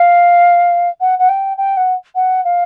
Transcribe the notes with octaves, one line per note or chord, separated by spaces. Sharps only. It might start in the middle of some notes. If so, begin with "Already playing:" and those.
Already playing: F5
F#5
F#5
G5
G5
F#5
F#5
F5